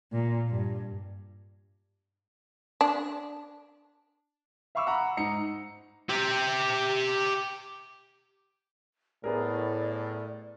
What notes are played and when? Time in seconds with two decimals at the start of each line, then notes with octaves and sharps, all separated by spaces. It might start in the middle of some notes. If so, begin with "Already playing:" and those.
0.13 A#2
0.50 G2
2.81 D4
4.75 E5 F5 B5 C#6 D6 E6
4.87 F#5 A#5 B5
5.17 G#2 D#4 A#5 C#7
6.10 G4 E5
9.24 A2 B3 G#4 A#4 D5